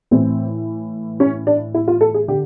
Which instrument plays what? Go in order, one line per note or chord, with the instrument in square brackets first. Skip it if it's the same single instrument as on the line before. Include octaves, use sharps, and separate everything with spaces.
[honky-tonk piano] A2 E3 C4
C#4
D4
E4
F4
A4
G#4
D3 G4